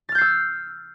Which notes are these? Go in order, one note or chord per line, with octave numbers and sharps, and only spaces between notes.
E6 F6 G6 A6 C7